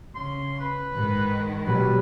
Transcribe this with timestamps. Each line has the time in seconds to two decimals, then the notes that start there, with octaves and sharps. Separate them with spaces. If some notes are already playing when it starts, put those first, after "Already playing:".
0.15 C#3 C6
0.60 B4
0.94 G#2 D#3 G#3
1.65 B2 F#3 G3 B4